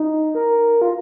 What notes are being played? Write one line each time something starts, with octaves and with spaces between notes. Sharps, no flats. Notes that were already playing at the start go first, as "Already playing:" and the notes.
Already playing: D#4
A#4
F4